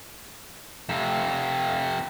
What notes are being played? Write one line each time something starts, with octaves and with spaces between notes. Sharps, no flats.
F2 C3